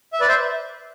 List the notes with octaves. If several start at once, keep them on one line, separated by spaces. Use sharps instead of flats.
E5
B4 D5
C5 E5